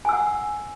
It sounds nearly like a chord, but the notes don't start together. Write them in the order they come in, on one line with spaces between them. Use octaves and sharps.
G#5 E6 F#5